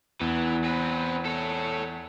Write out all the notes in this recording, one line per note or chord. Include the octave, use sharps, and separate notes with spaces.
E2 E3
C4 B4
A4 C#5